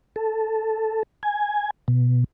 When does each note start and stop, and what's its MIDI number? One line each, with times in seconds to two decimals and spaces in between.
0.16 1.03 69
1.23 1.71 80
1.88 2.24 47